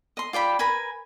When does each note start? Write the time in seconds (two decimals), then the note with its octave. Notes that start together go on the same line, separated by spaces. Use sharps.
0.17 D#5 C6
0.33 F4 D5 G5 B5
0.59 A#4 B4 G#5 B5